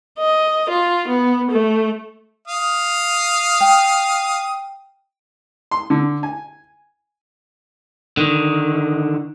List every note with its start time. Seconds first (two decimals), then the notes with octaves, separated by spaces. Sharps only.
0.18 D#5
0.70 F4
1.08 B3
1.51 A3
2.48 F5 D#6
3.61 G5
5.71 C6
5.90 D3
6.23 G#5
8.17 D3 D#3